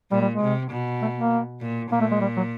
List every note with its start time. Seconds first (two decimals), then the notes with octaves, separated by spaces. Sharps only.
0.11 A#2 G3
0.21 G3
0.32 G#3
0.42 C3
0.71 B2
1.02 A3
1.17 A#3
1.61 A#2
1.91 A#2 A#3
2.01 A3
2.11 G#3
2.21 G3
2.36 F#3